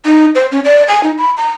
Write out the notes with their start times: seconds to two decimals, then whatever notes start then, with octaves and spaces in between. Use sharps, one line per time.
0.05 D#4
0.35 C5
0.52 C#4
0.65 D5
0.88 G#5
1.03 D#4
1.18 B5
1.37 A#5